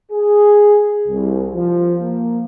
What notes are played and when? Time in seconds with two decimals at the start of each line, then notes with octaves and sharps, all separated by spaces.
0.11 G#4
1.07 C2
1.55 F3
2.01 A#3